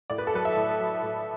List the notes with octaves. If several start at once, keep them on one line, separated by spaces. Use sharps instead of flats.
A2 D5
B4
A4
F#3 B4
E5
A2
F#3
A2